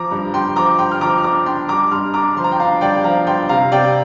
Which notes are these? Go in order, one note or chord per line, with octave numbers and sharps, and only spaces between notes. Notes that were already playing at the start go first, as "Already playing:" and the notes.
Already playing: F3 A#5 D6
G2
G2 G5 C6
F3 A#5 D6
G2 G5 C6
F6
F3 A#5 D6
F6
D4 A#5 D6
D4 G5 C6
G2 A#5 D6
G2 C6 F6
D4 A#5 D6
F3 C6
A#5
G5 C6
D4 F5 A#5
G2 D5 G5
F3 F5 A#5
G2 G5 C6
C3 F5 A#5
C3 D5 G5